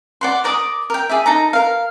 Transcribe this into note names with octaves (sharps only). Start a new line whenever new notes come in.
D5 F#5 C6
A#4 D5 D6 D#6
A#4 G5
G#4 D5 E5
D#4 A4 A#5
A#4 F5